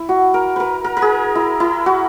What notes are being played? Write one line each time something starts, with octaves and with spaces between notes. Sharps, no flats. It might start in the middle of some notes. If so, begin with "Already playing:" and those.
Already playing: E4
F#4
A#4
A#4 B4
A#4
A#4
G#4
E4
E4
F#4